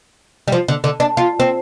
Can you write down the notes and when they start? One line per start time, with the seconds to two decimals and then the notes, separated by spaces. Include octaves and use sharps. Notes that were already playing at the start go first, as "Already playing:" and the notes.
0.48 G3
0.52 F3
0.68 D3
0.84 D3
1.00 D4
1.17 F4
1.40 C4